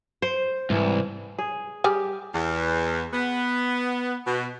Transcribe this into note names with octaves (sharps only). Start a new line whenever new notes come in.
C5
C2 G#2 C3 E3
G#4
G3 G4 G#4
E2
B3
B2